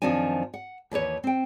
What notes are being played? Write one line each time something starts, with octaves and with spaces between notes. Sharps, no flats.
F#2 D#3 F3 C4 D4 G#5
F#5
D#2 E3 B4 C#5
C4 G5